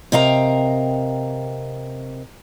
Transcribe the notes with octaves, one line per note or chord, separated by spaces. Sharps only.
C3 A#4 D#5 F5 G5 A#5